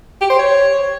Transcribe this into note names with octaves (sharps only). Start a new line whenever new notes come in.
G4
C5
C#5